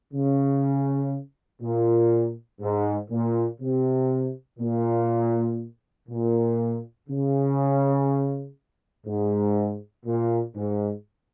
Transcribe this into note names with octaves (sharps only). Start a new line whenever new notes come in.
C#3
A#2
G#2
A#2
C3
A#2
A#2
C#3
G#2
A#2
G#2